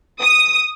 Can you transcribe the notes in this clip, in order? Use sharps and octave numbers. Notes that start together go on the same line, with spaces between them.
D#6